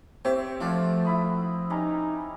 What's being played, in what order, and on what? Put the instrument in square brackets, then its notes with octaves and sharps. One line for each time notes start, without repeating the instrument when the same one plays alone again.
[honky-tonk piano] C4 [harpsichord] G4 [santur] C#5 E5
[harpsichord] F3 [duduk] A3 [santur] F4 F#4 D5
[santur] E4 B5 D#6
[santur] G3 C#4 A#5 [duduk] D#4